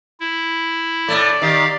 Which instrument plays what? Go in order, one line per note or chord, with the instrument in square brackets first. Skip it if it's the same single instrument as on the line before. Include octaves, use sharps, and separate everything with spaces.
[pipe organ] E4
[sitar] A2 A3 [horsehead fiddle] D5
[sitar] D#3 [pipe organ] G4 F5